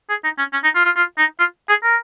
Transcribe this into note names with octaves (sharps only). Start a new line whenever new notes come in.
G#4
D#4
C#4
C#4
D#4
F4
F4
F4
D#4
F4
G#4
A#4